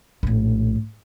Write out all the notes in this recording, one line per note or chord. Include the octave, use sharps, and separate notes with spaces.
A#1 A2